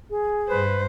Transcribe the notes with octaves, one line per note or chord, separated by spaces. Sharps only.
G#4
G2 B4 C5